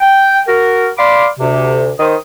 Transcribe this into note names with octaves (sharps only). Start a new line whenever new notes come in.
G5
F#4 A#4
D5 F5 B5 C6 D6
D2 C3
D#3 C5 D#6